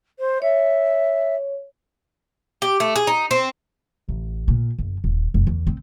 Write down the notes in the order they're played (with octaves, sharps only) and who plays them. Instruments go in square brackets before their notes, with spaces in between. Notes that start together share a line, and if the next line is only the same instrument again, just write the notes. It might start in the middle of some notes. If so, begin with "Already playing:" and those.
[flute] C5
[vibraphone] C#5 [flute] E5
[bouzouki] G4
A3
G#4
D#4
C4
[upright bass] A1
A#2
F#1
D#1
F1
E2
C4